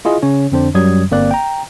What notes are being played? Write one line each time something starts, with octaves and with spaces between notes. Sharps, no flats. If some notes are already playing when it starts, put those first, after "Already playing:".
E4 F4 G#4 D#5
C#3 C#4 C#5
F2 D3 C4 D4 C5
F#2 F#3 G3 D#6 G#6
G1 A#3 C4 D5 F#6
G5 A#5